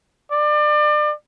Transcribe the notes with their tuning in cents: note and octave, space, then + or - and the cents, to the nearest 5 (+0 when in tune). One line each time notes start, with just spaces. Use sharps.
D5 +30